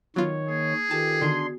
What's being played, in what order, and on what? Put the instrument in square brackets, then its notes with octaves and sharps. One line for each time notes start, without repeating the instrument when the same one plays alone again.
[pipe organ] D#3 C#5 [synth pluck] F#3 B3 F4
[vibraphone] A#3 [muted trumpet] G#4
[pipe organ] D#3 G4 [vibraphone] F4 A4 B4 [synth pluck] A5
[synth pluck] D3 D#3 [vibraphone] B3 F#4 [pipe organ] D4 C6